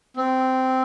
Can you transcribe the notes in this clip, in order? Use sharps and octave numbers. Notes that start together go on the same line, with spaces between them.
C4